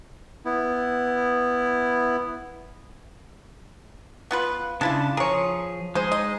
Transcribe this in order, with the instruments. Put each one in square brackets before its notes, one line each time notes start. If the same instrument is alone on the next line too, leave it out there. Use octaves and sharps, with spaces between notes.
[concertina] B3 E4
[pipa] B3 F4 B4
[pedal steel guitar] C#3 D4 A5 [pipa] G#3 E4 F4
[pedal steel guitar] F3 G#4 [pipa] A#4 C#5
[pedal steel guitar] G#3 D#4 G#4 [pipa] C5
[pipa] D#5